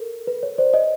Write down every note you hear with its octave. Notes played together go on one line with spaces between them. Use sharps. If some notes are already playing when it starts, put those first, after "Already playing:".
Already playing: A4 A#4
B4
C#5
C5 D5
C#5 D#5